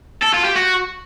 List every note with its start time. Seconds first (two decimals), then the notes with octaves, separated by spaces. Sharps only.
0.23 A4
0.34 F4
0.45 G4
0.56 F#4